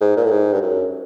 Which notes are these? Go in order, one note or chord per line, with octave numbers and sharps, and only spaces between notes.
G#2
A#2
A2
G#2
G2
F#2